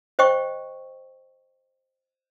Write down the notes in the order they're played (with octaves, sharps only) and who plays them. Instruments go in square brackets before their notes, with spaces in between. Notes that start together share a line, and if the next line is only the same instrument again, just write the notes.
[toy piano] C5 D#5 G5 C#6